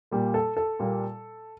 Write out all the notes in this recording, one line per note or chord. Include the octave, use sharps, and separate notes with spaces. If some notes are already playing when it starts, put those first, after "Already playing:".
A#2 G3 A#3
A4
A4
A#2 G3 A#3